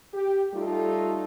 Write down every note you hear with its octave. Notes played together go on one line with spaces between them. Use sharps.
G4
G3 A3 D#4 F4 A4